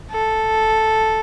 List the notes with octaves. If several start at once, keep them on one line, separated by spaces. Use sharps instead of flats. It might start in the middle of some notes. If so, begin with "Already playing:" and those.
A4